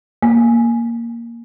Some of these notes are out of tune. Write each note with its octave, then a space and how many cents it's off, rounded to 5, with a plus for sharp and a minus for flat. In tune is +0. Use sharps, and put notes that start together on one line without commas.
A#3 +0